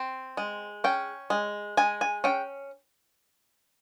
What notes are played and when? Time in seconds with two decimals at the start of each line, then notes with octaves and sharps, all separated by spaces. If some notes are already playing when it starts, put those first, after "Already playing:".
Already playing: C4
0.37 G#3
0.84 C#4 G5
1.30 G#3
1.77 G#3 G#5
2.01 G#5
2.24 C#4 G5